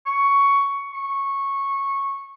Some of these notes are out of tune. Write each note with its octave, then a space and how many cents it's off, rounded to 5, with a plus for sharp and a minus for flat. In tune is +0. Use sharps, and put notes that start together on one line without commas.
C#6 +10
C#6 -10